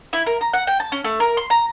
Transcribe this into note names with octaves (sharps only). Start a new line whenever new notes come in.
E4
A#4
A#5
F#5
G5
A5
C#4
A3
A#4
C6
A#5